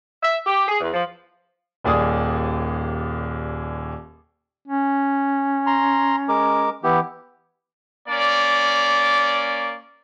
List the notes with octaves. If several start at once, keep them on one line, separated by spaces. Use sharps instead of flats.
E5
G4
G#4
E2
F3
D#1 D#2 G#4 D5 D#6
C#4
A#5 C6
G#3 A#4 D6
E3 B3 E4 G4
A#3 C#4 D5